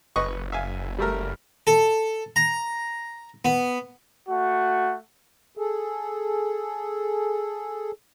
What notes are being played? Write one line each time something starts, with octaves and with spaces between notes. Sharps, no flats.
F#1 B4 D#5 C#6
E5 F5 G#5
G3 A3 A#4
A4
A#5
B3
A3 F#4 F#5
G#4 A4